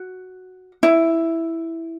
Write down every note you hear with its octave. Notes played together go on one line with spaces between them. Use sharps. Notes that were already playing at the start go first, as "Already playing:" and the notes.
Already playing: F#4
E4